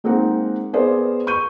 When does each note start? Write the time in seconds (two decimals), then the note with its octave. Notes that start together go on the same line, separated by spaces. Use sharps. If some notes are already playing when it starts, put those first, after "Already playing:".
0.04 G#3 A#3 C4 D#4 F#5
0.73 B3 G#4 A#4 C5 D5
1.27 C#6 G6 D#7